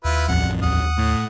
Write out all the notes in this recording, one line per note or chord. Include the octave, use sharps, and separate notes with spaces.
D#2 E4 F4 B4
A1 F2 F#5
D#2 F#5 D#6
A2